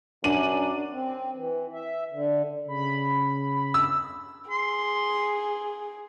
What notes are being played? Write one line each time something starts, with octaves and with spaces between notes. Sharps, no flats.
F#2 D4 D#7 F#7
C4
E3
E5
D3
C#3 B5
E6
G#4 C6